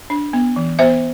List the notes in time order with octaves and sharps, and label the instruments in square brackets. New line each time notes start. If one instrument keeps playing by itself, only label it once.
[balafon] D4
B3
E3
B3 C5 E5